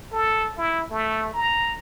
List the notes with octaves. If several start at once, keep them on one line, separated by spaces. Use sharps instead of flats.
A4
E4
A3
A#5